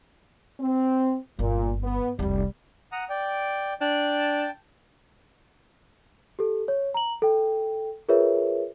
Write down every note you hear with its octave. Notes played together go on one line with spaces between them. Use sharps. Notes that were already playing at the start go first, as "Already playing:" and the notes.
C4
G1 A#2
B3
F1 C2 G3
F#5 A#5 D#6
D5 G5
D4 G5 A5
G4 A4
C#5
A#5 F#7
A4 G5
F4 G#4 A#4 B4 C#5 E5